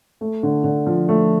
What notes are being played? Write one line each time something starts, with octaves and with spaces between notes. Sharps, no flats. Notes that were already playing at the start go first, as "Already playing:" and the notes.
A3
D3
D3
F3
A3